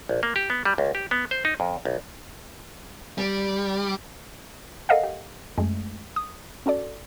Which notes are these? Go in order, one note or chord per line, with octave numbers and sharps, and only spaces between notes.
A#1
A#3
G4
B3
G3
C#2
G4
B3
C5
D#4
F2
B1
G3
A4 A#4 D#5 F5 F#5
G4
F#2 G#3 A3
D#6
C#4 F#4 A4 D5